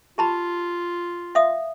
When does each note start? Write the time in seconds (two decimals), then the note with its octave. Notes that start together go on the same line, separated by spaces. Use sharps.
0.18 F4 G4 A5 B5
1.35 E5 F5 D#6